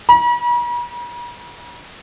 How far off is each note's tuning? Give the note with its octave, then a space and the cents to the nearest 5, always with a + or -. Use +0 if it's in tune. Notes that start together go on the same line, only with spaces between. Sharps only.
B5 -45